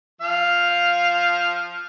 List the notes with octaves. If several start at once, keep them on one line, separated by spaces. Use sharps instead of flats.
F3 F5